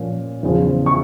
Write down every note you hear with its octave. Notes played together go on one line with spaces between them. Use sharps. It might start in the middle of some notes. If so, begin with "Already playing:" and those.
Already playing: A#2 F3 C#4
E2 C#3 F3
C#6